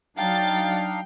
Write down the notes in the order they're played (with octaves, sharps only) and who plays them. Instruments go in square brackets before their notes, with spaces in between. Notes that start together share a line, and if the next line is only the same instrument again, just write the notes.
[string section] F#3 A6 [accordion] D4 D#4 F5 [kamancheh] G5